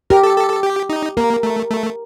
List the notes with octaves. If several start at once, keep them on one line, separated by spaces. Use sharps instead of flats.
G4 A#4
A4
A4
A4
G4
D#4
A#3 A#4
A3
A3